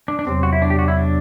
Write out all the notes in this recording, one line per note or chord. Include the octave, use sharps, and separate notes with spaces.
D4
D4
E2 C3 F#3 C4
F#4
E4
D4
G4
F#4
E4
D4